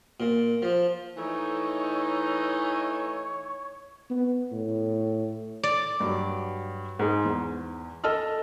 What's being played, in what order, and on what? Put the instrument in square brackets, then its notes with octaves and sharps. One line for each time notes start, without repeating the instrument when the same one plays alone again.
[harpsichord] A#2
F3
[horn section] E3 A3 D#4 [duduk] C#5
[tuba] B3
A2
[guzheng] D5
[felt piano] G2 F#3
G#2 G#4
E2
A4 D#5 A5 E6 F6